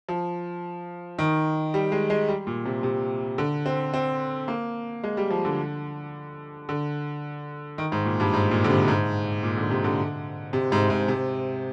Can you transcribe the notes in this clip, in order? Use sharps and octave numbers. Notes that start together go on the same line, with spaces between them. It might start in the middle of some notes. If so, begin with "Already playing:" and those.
F3
D#3
G3
G#3
G#3
G3
A#2
C3
C3
D3
C4
C4
A#3
G#3
G3
F3
D3
D3
D#3
G#2
A#2
G2
G#2
A#2
D3
C3
G#2
A#2
D3
C3
D3
C3
G#2
G#2
C3